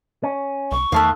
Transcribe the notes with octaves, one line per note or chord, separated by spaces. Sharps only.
C#4
C2 C#6
E2 D#3 A3 A4 F5 A5 F#6